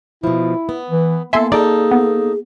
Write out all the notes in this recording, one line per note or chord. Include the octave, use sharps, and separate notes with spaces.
B2 F3 E4
B3
E3
A#3 B3 E4 A4 E5 G#5 C6
D#4 G#4 A4 D5
B3